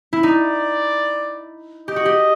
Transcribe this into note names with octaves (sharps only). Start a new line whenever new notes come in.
E4
D#4 D5
G4 D#5
F#4
G4